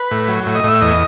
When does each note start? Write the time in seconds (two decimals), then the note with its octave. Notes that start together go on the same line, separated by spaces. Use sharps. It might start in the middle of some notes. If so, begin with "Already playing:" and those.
Already playing: B4
0.11 A2
0.28 F#3
0.46 A2
0.55 D#5
0.64 A2 E5
0.81 E2 D#5